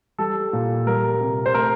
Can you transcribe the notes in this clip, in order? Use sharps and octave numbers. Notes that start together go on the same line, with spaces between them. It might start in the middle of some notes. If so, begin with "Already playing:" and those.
G3 A4
A#2
G3 A#4
C3
C5
A3 A#4